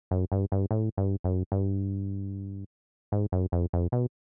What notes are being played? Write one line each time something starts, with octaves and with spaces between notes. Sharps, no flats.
F#2
G2
G2
A2
G2
F#2
G2
G#2
F#2
F2
F2
B2